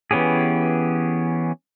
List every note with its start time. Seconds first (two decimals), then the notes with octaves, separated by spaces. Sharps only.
0.11 E3 B3 C#4 G4 G#4